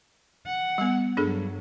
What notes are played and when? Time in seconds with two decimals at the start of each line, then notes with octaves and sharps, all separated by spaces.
0.46 F#5
0.78 G3 B3
1.17 G2 F#3 D4 G#4 A4